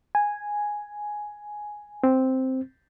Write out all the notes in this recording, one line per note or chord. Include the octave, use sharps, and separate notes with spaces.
G#5
C4